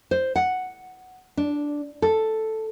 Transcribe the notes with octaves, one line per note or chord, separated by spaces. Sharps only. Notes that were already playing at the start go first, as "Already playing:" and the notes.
C5
F#5
D4
A4